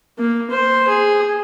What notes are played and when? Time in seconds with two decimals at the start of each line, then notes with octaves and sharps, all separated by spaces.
0.18 A#3
0.51 C5
0.88 G#4